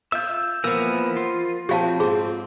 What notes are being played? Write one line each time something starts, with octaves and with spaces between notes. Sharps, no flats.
F4 E5 E6 G6
E3 F3 A#3 B3 E6
F4
F3 F#3 C4 G4 F5 A5
G#2 C4 G#4